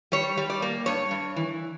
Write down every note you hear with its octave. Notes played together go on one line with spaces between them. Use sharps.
G3 C#5
G3
D5
A#3
G2 C#5
G2
E3